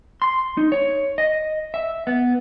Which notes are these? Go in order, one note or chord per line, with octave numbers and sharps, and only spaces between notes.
C6
D#4
C#5
D#5
E5
B3